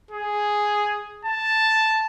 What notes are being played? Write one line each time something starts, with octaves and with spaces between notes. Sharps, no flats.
G#4
A5